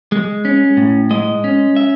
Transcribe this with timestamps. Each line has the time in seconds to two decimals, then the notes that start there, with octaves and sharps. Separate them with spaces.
0.12 G#3
0.45 C#4
0.77 A2
1.11 G#3 D#5
1.44 C#4
1.76 E5